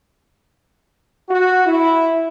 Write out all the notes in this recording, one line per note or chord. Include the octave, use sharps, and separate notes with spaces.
F#4
E4